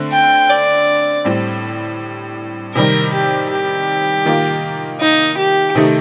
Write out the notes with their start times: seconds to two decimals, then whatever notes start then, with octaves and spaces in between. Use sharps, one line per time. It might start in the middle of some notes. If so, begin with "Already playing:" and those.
Already playing: D3 A3 C4
0.13 G5
0.50 D5
1.25 A2 G3 C4
2.75 C3 D#3 G3 A#4
3.13 G4
3.50 G4
4.25 D#3 A#3 F4
5.00 D#4
5.38 G4
5.75 C3 D#3 A3 D#4 G4